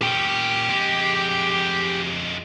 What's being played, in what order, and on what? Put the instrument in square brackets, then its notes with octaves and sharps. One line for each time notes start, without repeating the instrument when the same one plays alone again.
[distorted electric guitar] A#2 C#4 [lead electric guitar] G4 G5
[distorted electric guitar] F2 G#3